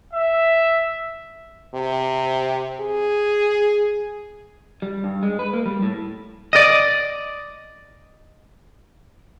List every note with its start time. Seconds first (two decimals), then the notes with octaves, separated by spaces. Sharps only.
0.13 E5
1.74 C3
2.80 G#4
4.82 G3
5.04 G2
5.23 G#3
5.39 B4
5.53 A#3
5.66 G3
5.82 A2
6.53 D5 D#5